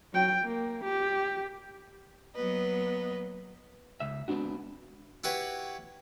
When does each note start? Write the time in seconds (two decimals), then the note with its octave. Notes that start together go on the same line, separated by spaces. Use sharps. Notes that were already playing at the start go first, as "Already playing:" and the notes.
0.13 F#3 G5
0.44 A#3
0.84 G4
2.35 F#3 A#3 B3 B4 D#5
4.00 C#2 E5
4.28 G#3 B3 C4 D4 F#4
5.24 E4 F#4 G4 B4 C#5